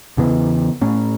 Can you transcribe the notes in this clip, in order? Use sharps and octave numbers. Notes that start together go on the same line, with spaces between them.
E2 C#3 E3 B3
A2 A3 C#4